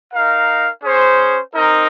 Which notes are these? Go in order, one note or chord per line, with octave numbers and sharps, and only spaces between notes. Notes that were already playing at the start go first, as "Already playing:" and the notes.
D#4 A#4 F5
C#4 G#4 C5
C4 D#4 A#4